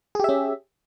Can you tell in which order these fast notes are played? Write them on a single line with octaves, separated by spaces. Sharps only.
G#4 G4 E5 C#4